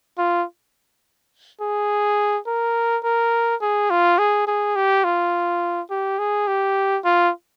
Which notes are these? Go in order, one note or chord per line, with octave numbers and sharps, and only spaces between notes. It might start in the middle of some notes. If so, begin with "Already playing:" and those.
F4
G#4
A#4
A#4
G#4
F4
G#4
G#4
G4
F4
G4
G#4
G4
F4